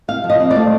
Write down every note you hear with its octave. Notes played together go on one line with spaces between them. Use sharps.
C3 F5
F3
D#5
C4
D5
A3